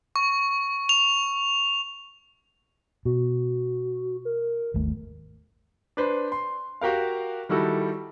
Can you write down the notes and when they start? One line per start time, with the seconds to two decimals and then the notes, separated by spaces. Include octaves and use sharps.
0.16 C#6
0.89 F7
3.05 B2 F#4
4.25 A#4
4.74 G#1 D#2 A3
5.97 D4 B4 C5
6.32 C6
6.81 F#4 G4 A#4 F5
7.49 D#3 G3 E4 F#4 A4